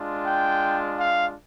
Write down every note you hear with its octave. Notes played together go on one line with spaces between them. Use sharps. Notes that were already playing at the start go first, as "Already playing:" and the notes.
Already playing: G#3 D4 F4
G5
F5